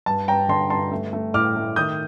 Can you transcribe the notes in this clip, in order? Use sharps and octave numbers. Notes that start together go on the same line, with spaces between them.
G2 A5
G2 G5 A#5
D3 A5 C6
G2 A5 C6
A3
A3
A2 D6 F6
A3
D#3 D#6 G6